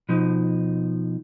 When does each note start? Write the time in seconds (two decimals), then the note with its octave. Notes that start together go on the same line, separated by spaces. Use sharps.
0.09 B2 F3 D#4